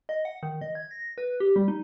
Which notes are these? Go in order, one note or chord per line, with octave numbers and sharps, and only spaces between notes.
D#5
F#5
D#3
D#5
G#6
A#6
B4
G4
G3
D#4